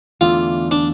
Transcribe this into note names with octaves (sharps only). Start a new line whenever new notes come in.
E2 D3 A3 F4
D4